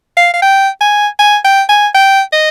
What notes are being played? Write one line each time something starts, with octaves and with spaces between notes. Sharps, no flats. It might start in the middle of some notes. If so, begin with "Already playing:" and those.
F5
F5
G5
G#5
G#5
G5
G#5
G5
D#5